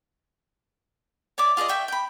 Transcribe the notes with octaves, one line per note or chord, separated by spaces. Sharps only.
C#5 D5 E5 D6
F4 G#4 D5 D#5
E5 G5 C#6
G5 B5